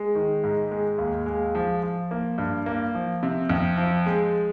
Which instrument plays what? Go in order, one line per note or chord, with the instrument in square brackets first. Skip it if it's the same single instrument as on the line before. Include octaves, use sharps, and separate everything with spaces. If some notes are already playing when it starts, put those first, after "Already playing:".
Already playing: [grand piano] G#3
D#3
G#2
G#3
D#2
G#3
F3
F3
A#3
G2
A#3
F3
C3
F2
F3
G#3